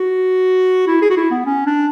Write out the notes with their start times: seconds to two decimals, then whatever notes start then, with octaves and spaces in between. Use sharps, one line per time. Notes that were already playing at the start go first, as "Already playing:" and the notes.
Already playing: F#4
0.87 E4
1.02 G#4
1.10 F#4
1.17 E4
1.31 B3
1.46 C#4
1.66 D4